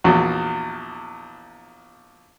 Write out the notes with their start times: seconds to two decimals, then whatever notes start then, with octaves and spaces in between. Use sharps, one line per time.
0.04 A#1 E2 F#4